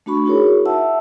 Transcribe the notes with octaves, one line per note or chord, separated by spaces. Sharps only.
A3 D4 F#4 B5 C#6
D#4 E4 F#4 G#4 A#4 C#5
E5 F#5 A5 E6